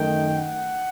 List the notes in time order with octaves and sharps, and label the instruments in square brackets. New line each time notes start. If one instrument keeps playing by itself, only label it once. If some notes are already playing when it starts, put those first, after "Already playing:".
Already playing: [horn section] F#2 D#3 A3 D#4 G5
F#5